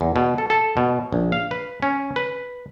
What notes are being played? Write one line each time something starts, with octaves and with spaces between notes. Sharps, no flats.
E2
B2
A4
A4
B2
A#1
F5
B4
C#4
B4